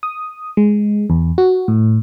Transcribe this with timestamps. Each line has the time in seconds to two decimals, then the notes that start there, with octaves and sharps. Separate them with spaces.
0.03 D#6
0.57 G#3
1.10 E2
1.38 F#4
1.68 A2